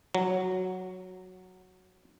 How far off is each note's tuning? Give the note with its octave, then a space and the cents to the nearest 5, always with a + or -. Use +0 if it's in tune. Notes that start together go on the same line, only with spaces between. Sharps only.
F#3 -5